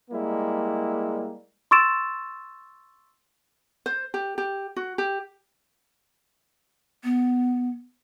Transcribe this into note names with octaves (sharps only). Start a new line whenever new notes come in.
G3 G#3 A#3 E4
C6 C#6 E6 A6 D7 E7
C5
G4
G4
F#4
G4
B3